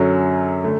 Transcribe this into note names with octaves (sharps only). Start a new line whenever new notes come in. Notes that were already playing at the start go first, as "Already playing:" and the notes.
Already playing: F#2 D3 F#3 C#4
D3 A3